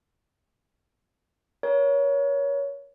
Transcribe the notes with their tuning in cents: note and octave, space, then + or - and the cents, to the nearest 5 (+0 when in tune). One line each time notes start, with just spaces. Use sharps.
A#4 +35 C#5 +15